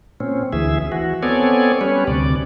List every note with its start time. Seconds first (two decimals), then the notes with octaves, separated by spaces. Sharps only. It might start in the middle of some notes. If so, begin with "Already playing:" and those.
0.20 A#2 C4 C#4
0.53 D2 E3 G#4 E5
0.92 E3 F#4
1.23 B3 C4 A4 C#5 D5 G#5
1.81 G3 C#4 B4 C#5
2.07 D2 C3 D5